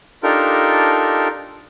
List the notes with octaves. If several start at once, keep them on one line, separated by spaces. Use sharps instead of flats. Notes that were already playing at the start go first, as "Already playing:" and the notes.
D4 D#4 F4 G4 A4 A#4